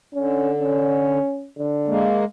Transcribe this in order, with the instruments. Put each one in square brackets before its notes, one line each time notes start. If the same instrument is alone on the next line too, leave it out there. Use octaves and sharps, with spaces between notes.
[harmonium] D3 [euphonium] C#4
[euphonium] C#4
D3
[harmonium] G#3 A#3